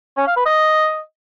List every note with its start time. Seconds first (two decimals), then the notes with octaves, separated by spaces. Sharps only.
0.17 C#4
0.27 F5
0.36 B4
0.46 D#5